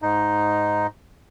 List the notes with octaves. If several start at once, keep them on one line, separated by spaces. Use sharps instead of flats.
G#2 D#4